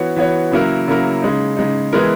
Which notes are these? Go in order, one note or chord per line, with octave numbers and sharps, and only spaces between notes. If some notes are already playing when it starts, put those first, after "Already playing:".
Already playing: E3 B3 F#4 C#5
E3 B3 F#4 C#5
C#3 F#3 A#3 E4 A#4
C#3 F#3 A#3 E4 A#4
C#3 G#3 D#4
C#3 G#3 D#4
E3 G#3 B3 E4 A#4